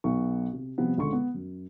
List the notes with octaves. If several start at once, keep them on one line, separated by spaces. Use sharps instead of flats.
B1 B3 C#6
C3
C3 F3 G3 B3
C#2 D3 C6 C#6
B3
F#2